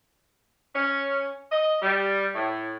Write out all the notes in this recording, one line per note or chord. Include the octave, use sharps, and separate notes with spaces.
C#4
D#5
G3
A2